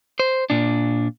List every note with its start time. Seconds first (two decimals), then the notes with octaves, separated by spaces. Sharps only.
0.20 C5
0.50 A#2 D4